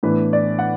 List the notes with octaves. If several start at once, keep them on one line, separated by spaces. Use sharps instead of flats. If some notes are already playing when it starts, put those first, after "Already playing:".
A2 E3 B3 D4 B4
D5
F#5